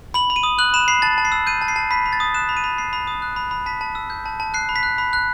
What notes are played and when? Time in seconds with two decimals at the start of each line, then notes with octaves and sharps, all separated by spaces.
0.14 B5 F#7
0.30 B5
0.36 D#7
0.43 D#6
0.59 F#6 F#7
0.74 B5 E7
0.88 B5 C7
1.02 A5 A6
1.18 A5
1.25 C7
1.32 E6
1.47 G6 D#7
1.62 A5
1.68 C7
1.76 A5
1.91 B5 B6
2.06 B5
2.13 A6
2.20 D#6
2.34 F#6 E7
2.49 B5
2.57 D#7
2.64 B5
2.78 B5 C7
2.93 B5
3.07 D#6
3.22 F#6
3.36 B5
3.51 B5
3.66 A5 B6
3.81 A5
3.95 E6
4.10 G6
4.26 A5
4.40 A5
4.54 F#6 C7
4.69 B5
4.76 B6
4.83 F#6
4.98 B5
5.13 F#6